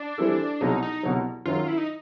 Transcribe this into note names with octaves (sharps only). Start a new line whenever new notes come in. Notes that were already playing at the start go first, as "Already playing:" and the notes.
Already playing: D4
E3 G3 C4 E4 A4
C2 B2 F#3 D#4
D#4
C2 B2 F#3
F#2 D#3 F#3 F4
E4
D#4